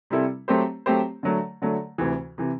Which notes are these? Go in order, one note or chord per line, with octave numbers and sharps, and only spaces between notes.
C3 G3 C4 E4 A4
F#3 A3 C4 G4 C5
F#3 A3 C4 G4 C5
D3 F#3 A3
D3 F#3 A3
D2 C3 E3
C3 E3